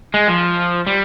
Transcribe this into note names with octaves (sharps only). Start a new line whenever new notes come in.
G#3
F3
G3